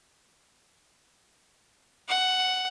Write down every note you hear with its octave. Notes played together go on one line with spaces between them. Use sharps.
F#5